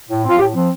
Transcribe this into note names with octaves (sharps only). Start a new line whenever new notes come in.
A2
F3 C4 F4
A2 G4
F3 C4